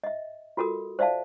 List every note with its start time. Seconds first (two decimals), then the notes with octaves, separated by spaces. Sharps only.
0.04 D#5 E5
0.57 F4 F#4 A4 A#4 D#6
0.99 C5 D5 E5 F5 A5